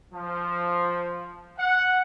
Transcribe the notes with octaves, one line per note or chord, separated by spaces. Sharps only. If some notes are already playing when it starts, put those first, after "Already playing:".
F3
F#5